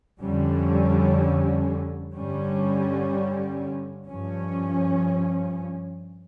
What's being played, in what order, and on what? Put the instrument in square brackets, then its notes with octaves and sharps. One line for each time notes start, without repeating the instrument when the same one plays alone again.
[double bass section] F2 D3 G3 C#4
G2 D3 G3 C#4
G2 F3 C#4